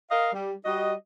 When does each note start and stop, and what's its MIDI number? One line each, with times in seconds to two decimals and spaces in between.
0.10 0.30 70
0.10 0.30 75
0.10 0.30 77
0.32 0.53 55
0.64 0.93 55
0.64 0.93 66
0.64 0.93 75